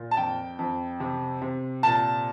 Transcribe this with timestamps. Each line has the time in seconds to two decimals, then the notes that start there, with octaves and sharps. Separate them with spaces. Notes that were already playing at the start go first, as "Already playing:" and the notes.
Already playing: A#2
0.11 A5
0.17 F2 G5
0.59 F2
1.00 C3
1.42 C3
1.83 A#2 A5